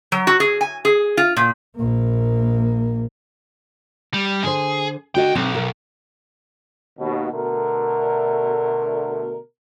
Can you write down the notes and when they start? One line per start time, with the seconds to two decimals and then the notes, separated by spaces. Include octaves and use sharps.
0.12 F#3
0.27 F#4
0.40 G#4
0.61 G#5
0.85 G#4
1.17 F4
1.37 A#2
1.76 A#1 A#3
4.14 G3
4.44 D3 G#4 C5
5.15 D#2 D3 F#4 D#5 G5
5.35 B1 C4
5.55 A#4
6.99 D#2 B2
7.32 B2 D3 A3 A#4